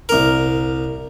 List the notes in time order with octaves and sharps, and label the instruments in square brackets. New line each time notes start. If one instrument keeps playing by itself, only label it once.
[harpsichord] C2 A#4